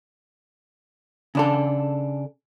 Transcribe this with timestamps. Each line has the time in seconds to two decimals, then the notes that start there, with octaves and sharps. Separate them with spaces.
1.35 C#3 D4 A4